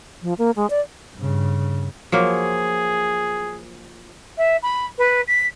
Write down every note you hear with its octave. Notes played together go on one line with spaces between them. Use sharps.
F3
A#3
G#3
D5
G2 C#3
F3 F#3 A#3 G#4
E5
B5
B4
B6